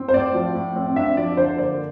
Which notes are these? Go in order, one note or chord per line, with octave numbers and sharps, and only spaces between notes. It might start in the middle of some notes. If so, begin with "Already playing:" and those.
Already playing: C4
C5
A2 D5
F3
A2
C4
D4 E5
F3 D5
D3 C5
A#3 D5